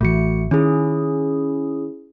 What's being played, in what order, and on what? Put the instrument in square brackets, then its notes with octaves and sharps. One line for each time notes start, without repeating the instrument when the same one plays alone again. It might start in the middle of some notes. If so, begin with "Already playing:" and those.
[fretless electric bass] A1 E3 [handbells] A3 F#4 C#7
[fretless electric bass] D#3 [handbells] C#4 E4 G#4